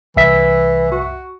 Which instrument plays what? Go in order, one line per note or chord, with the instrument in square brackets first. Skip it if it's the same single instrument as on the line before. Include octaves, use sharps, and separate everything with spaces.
[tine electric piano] C2 E5 B6 [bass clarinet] E3
[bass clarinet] F#4